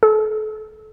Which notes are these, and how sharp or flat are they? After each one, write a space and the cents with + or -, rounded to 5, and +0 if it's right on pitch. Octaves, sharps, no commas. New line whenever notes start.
A4 -35